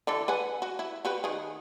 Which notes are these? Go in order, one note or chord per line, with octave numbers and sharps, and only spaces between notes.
D3 E3 A4
B4 F#5 G#5
F#4
E4
F#4 G4 B4
D#3 G#4